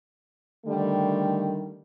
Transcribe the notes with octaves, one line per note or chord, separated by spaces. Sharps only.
D3 D#3 G3 A3